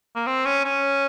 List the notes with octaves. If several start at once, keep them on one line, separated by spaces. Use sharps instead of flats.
A#3
C4
C#4
C#4